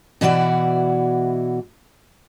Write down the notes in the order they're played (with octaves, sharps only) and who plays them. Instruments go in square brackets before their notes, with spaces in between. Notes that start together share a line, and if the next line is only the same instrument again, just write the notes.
[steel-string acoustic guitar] B2 E3 E4 F#4 B4 D5